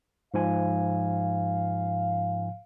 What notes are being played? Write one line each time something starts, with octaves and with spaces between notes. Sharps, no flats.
G#2 F3 F5 G#5